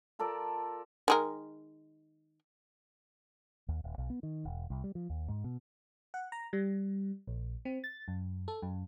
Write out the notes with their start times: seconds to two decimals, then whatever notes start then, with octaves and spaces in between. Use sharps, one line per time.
0.19 F4 A4 A#4 D5
1.08 D#3 G#3 A#4
3.68 D#2
3.84 D#1
3.98 B1
4.10 B3
4.23 D#3
4.45 E1
4.70 C2
4.84 G3
4.95 F3
5.10 D#2
5.28 G#2
5.44 B2
6.14 F#5
6.32 A#5
6.53 G3
7.27 A#1
7.65 C4
7.84 A6
8.08 F#2
8.48 A4
8.62 F#2